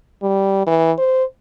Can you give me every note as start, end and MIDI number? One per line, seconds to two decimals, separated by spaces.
0.22 0.64 55
0.67 0.92 52
0.98 1.24 72